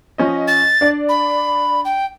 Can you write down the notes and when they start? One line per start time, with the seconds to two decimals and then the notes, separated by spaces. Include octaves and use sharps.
0.18 F3 C#4 D#5
0.48 A6
0.81 D4 D5
1.09 B5
1.85 G5